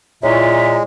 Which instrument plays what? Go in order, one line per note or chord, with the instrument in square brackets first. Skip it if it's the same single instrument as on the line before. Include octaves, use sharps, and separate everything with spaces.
[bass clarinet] A#2 [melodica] G#3 [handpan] E4 C#5 [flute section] F4 E5 A#5